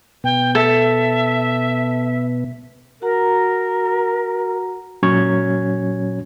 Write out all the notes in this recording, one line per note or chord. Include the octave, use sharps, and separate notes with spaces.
B2 B3 G5
A4 E5
F#4 A#4 F#5 A#5
A#2 F#3 C#4 F#4 C#5 G#6